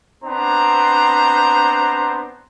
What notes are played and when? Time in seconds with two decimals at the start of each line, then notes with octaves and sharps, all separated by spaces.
0.23 B3 C4 D4 C5 A#5